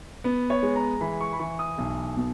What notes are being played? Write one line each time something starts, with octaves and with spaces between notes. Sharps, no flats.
B3
C#5
G#3
A#5
E3 B5
C#6
B5
E3 C#6
D#6
B1
B2